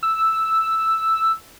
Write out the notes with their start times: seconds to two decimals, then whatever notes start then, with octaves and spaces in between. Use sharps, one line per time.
0.03 E6